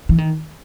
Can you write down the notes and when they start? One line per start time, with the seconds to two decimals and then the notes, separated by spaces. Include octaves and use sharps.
0.09 E3
0.18 D#3